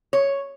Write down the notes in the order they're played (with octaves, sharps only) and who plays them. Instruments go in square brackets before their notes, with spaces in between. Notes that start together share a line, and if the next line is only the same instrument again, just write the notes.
[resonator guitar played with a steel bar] C#5